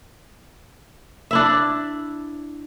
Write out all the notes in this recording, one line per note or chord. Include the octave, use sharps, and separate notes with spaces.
D4 E4 E5